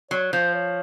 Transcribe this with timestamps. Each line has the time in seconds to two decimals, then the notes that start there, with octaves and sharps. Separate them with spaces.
0.11 F#3 C#5
0.33 F3 C5
0.55 C#5